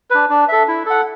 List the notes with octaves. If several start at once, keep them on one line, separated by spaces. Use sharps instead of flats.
D4 B4
D4
A4 E5
E4
A4 F#5